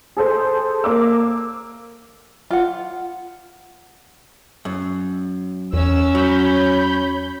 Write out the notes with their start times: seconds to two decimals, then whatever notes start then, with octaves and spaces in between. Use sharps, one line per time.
0.17 G#4 A4 C5
0.84 A#3 D6 E6
2.50 F4 F#5
4.65 F#2
5.73 E2 C#4 E6
6.15 F#3 C#5 B5 G6